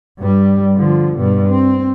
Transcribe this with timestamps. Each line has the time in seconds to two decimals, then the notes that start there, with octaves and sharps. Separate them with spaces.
0.20 G2 G3
0.76 D3 F3
1.17 G2 B2
1.49 C4